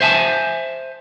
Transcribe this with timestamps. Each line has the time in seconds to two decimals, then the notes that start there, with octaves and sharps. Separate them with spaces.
0.01 C5 E5 G#5 A5